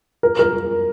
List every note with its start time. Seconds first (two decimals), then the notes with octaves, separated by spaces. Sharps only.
0.23 A#4
0.39 A#4